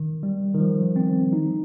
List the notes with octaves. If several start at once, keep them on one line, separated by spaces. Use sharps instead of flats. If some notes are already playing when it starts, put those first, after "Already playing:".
Already playing: D#3
G3
D#3
F3
C4
D#4